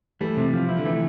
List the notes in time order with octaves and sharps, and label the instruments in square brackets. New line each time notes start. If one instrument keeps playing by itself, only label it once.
[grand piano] E3 G3 [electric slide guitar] A3
[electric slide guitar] C3
F3
E4
[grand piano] D3
[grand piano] C3 E3 [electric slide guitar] A3